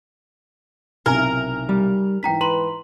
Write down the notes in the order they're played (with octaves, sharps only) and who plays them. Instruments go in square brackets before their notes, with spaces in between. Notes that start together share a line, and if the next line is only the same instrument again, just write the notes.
[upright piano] B1 C3 E4 [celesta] D#4 G#5 [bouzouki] A#4
[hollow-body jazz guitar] G3
[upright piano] G#2 E3 [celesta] G5 A#5 B6
[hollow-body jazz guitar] B4 [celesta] A#5 C6 F#7